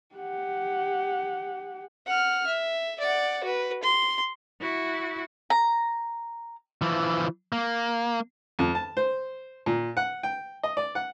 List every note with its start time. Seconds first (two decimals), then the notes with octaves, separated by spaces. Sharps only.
0.15 G4 F#5
2.07 F#5 F6
2.47 E5
3.00 D5 F#5
3.44 F#4 B4
3.83 C6
4.61 E4 F#4
5.50 A#5
6.82 E3 F3
7.52 A#3
8.59 F2
8.75 A5
8.97 C5
9.66 A#2
9.97 F#5
10.23 G5
10.63 D#5
10.77 D5
10.95 F#5